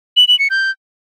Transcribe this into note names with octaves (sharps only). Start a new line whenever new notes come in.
F#7
F#7
C#7
G6